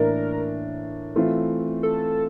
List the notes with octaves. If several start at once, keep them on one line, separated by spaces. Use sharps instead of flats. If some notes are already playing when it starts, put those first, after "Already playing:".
Already playing: A2 E3 A#3 D4 A#4
E3 A3 C4 F4
A4